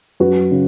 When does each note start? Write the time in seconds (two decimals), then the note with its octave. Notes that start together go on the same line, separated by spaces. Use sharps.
0.20 F#2 F#4 B4
0.51 C#3